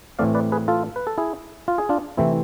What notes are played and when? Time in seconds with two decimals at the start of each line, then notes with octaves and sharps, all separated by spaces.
0.19 A2 E3 A3 C4 D5 F5
0.35 B4 D5
0.52 G#4 B4
0.68 F4 A4
0.96 B4
1.07 A4
1.18 E4 G#4
1.68 F4
1.78 G#4
1.89 D4 F4
2.17 C3 E3 A3 C4 E4